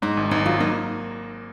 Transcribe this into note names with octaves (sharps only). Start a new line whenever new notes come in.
G#2 D#4
G#1
G#1 D#4
F#3 F4
A#3 D#4